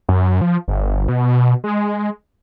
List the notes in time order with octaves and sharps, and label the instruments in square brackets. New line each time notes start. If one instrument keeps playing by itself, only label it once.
[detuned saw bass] F#2
F3
G1
B2
G#3